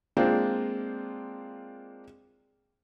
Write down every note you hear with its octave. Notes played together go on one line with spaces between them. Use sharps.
G#3 A#3 C4 D4 F4 C5